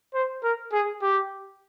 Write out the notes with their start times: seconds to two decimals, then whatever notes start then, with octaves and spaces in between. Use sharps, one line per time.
0.14 C5
0.43 A#4
0.73 G#4
1.02 G4